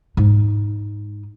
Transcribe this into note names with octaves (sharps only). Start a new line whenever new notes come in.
G#2 D#4